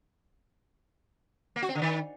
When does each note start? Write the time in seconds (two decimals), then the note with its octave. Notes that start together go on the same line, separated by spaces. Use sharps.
1.56 A#3
1.62 F#4
1.69 C4
1.75 D3
1.82 D#3